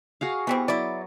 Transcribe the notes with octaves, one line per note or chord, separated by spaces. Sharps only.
F#4 G#4 F5
E3 G3 B3 C4 C#6
F#3 E4 D5